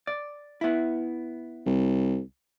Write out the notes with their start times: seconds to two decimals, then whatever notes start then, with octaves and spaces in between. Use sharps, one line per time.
0.07 D5
0.61 B3 E4
1.66 C2